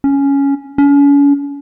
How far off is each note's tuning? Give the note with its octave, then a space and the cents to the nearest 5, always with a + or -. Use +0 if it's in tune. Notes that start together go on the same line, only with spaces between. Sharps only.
C#4 +5
C#4 +40